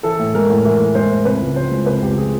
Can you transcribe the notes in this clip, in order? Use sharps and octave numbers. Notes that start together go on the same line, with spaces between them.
E3 A4
A2
G#3 A#4
A2
E3 A#4
A2
G#3 C5
A2
C3 B4
C#2
F3 C5
G#3
C3 B4
C#2 G4
F3 G#4